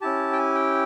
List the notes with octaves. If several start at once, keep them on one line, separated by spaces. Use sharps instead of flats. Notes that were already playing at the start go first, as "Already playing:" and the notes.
C#4 E4 G4 A5
G5
G#5
G5